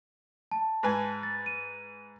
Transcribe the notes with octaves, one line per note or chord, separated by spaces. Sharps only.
A5
G#2 B4 G#5
A6
D#7